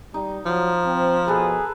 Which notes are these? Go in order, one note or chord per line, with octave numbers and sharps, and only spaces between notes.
G3 D#4
F3 F#3
C4
B2 G#4 A4 B4